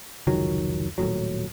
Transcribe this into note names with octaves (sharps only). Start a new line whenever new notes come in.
F1 C#2 D#3 F#3
D#1 A2 F#3